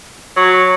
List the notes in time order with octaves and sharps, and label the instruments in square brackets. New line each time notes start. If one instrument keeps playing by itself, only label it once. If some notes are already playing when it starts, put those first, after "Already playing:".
[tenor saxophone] F#3